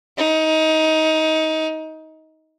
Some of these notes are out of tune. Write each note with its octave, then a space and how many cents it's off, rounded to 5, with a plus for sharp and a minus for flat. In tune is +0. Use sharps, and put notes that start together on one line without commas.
D#4 +20